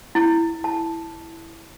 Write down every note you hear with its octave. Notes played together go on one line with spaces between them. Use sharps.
E4
A5